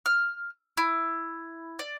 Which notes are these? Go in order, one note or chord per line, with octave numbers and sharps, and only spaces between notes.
F6
E4
D5